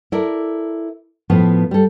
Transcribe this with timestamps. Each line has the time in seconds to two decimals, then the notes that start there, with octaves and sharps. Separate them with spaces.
0.12 E4 A4 A#4 D5
1.30 A2 F3 B3
1.71 G3 A4